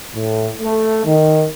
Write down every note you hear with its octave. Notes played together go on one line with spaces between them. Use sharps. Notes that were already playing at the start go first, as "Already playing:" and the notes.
A2
A3
D#3